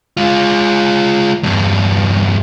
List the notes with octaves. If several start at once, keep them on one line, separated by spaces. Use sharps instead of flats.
G#3 F4
E2 G2